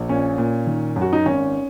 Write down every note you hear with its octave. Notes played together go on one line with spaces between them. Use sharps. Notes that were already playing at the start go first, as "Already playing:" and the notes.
Already playing: A#1
A#2 C#4
A#2
D#3
F#2
F#4
D#4
G#1 C#4